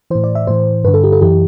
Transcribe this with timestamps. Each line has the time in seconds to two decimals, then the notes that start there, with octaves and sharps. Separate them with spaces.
0.10 A2 E3 C5
0.24 D5
0.35 E5
0.47 A2 E3 C5
0.84 G2 B4
0.88 D3
0.94 A4
1.04 G4
1.12 A4
1.21 F#2 E3 G4